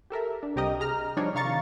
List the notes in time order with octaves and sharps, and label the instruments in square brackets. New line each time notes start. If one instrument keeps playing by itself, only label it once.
[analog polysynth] G4 A4 A#4 E5
D4
C2 C3 G4 A#4 D#5 D#6
G#4 A#5 F6
F3 G3 D4 D#4 C#5
C3 D#3 F5 A#5 C#6 A6